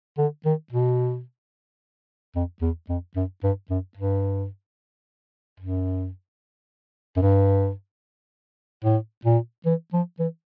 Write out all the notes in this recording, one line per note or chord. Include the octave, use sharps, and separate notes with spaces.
D3
D#3
B2
F2
E2
F2
F#2
G2
F#2
G2
F#2
F#2
G2
A2
A#2
E3
F3
E3